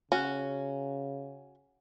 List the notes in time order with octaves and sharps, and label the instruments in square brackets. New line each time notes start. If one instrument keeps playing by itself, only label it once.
[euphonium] C#3 [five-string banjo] C#4 F#4